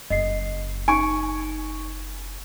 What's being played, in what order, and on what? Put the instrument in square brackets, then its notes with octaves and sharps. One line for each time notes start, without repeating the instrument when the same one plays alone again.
[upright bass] F#1 [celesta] D#5 C7
[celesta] D#4 D7 [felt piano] G#5 C#6